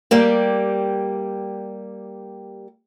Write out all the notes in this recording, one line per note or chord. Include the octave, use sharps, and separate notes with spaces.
G3 A#3 G4